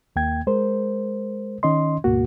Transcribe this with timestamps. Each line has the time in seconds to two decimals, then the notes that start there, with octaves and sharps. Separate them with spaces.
0.16 D#2 A#3 G5 G#6
0.47 G#3 A#4 C5
1.63 D#3 C#4 D#5 C6
2.04 D2 G#2 B2 A#3 F#4